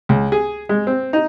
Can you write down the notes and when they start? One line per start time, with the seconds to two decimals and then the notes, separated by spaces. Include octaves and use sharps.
0.09 C#2
0.32 G#4
0.69 G#3
0.87 C4
1.13 D#4